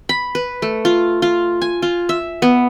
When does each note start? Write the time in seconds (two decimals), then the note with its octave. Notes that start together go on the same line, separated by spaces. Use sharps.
0.09 B5
0.35 B4
0.62 A3
0.85 F4
1.22 F4
1.62 G#5
1.82 F4
2.09 E5
2.42 B3